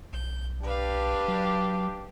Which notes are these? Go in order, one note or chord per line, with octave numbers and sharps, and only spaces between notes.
B1 G6
D4 G4 B4 F5
F#3